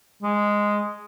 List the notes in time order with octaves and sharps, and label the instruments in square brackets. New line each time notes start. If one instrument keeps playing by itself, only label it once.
[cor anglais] G#3